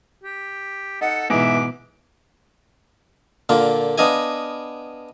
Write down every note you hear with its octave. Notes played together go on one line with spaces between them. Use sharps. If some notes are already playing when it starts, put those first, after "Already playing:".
G4
D#4 A4 F#5
G#2 B2 E3 E5 D6
A#2 D3 A#3 F4
B3 D4 D#5 F5 G#5